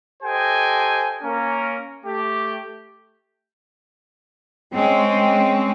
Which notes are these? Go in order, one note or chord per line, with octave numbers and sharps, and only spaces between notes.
G4 A4 C5 D#5 G5 G#5
A#3 C#4 A#4
A3 G4
G#3 C4 C#4